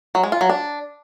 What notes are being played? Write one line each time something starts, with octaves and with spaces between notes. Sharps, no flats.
F#3
G#3
F4
F#3
D4